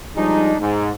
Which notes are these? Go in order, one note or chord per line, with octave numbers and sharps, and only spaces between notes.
F3 G3 G#3 D4 D#4
G#2